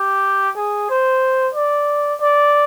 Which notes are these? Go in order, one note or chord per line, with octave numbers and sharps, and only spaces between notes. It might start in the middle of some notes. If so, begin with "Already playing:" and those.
Already playing: G4
G#4
C5
D5
D5